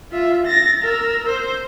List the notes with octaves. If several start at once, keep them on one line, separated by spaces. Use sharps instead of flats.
F4 E5
A6 A#6
A#4 E6
C5